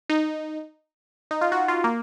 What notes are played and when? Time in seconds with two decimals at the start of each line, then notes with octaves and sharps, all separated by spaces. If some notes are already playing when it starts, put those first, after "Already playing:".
0.09 D#4
1.31 D#4
1.41 F4
1.52 F#4
1.68 F4
1.84 A#3